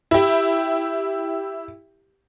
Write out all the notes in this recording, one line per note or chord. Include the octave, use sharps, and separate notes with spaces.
E4 G4